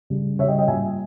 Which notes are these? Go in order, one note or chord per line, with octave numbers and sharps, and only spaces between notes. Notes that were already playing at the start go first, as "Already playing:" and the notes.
C#3 G3
C#3 G3 C#5 D#5 E5 G5
D#5 G5
A#2 G3 E5 G#5